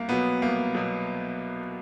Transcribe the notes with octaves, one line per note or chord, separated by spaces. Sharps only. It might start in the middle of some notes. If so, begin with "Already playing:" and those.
Already playing: C2 A#3
B2 F#3 B3
C2 A#3
B2 F#3